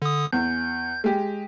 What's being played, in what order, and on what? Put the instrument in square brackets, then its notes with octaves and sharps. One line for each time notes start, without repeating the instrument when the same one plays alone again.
[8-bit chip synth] D3 D#6
[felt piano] E2 [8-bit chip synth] G6
[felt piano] G#3 G4